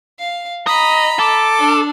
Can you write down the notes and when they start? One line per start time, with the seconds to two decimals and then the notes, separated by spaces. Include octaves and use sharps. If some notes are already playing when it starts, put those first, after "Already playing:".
0.19 F5
0.67 D#5 A#5 B5
1.19 A4 D6
1.58 D4